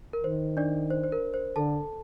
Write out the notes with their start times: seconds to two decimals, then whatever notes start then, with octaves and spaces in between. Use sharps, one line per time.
0.13 A#4
0.23 D#3 C5
0.57 D4 D5
0.90 C5
1.04 C5
1.12 A#4
1.34 C5
1.56 D3 A4 A5